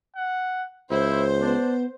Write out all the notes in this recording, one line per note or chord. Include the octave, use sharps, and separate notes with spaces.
F#5
C#2 E4 C5
B3 D4